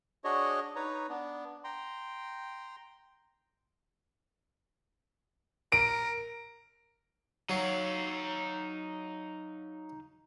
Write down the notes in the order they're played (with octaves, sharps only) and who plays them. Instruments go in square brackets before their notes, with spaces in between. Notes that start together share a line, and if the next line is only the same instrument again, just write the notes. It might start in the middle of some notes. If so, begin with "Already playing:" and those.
[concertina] D4 F#4 G#4 C#5 D#5
D#4 B4 C#5 A#5
B3 D4
G5 A#5 C6
[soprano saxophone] A#4 [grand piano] D7
[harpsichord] F#3 [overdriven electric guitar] D#4 F5